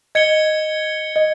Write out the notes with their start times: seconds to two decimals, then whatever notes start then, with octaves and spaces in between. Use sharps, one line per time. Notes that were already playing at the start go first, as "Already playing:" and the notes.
0.15 D#5 G#6 C#7 G7
1.16 D#5